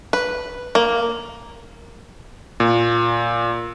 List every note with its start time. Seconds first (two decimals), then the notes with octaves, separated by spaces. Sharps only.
0.13 B4
0.75 A#3
2.60 A#2